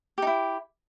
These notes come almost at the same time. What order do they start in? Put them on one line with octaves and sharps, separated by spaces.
G4 D#4 E4